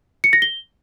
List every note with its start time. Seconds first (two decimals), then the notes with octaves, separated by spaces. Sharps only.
0.24 C#7
0.33 A#6
0.42 G7